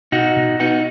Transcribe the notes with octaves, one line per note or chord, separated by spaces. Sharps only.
B2 D#4 F#4
B2
B3 D#4 F#4